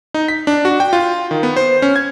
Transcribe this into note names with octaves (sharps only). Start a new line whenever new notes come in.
D#4
B6
D4
F#4
G5
F4
D#3
B3
C5
C#4
G#6